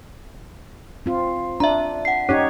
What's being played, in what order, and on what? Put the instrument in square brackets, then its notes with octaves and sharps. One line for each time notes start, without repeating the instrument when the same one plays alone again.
[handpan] C4 F4
[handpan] D4 [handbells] E5 A#5
[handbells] F#5 C7
[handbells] C#4 [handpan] D#4 G4 C#5